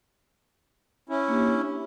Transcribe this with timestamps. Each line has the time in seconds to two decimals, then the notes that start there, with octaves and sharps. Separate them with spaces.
1.09 C#4 E4
1.28 A#3 D4 G4
1.54 C#5